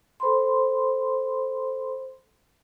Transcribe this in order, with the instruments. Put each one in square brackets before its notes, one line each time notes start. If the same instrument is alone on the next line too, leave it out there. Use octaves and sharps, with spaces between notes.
[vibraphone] A4 C5 B5 C6